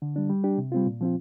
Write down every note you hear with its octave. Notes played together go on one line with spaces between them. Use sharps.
D3
G3 D4
G3
D4 G4
C3
G3 C4 F4
A#2
F3 C4 F4